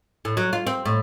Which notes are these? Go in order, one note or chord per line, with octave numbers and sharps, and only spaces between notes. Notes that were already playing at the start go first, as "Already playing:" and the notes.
A2
F#3
F4
C4
A2